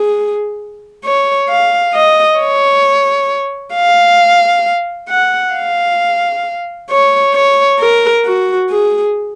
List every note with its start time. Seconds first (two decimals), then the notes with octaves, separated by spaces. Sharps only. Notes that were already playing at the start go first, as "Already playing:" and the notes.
Already playing: G#4
1.04 C#5
1.49 F5
1.93 D#5
2.39 C#5
3.75 F5
5.09 F#5
5.54 F5
6.90 C#5
7.34 C#5
7.79 A#4
8.25 F#4
8.70 G#4